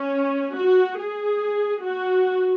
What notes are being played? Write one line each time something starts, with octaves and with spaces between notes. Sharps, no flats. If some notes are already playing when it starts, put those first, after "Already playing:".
Already playing: C#4
F#4
G#4
F#4